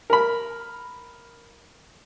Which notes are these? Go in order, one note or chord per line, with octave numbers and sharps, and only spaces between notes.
A#4 B5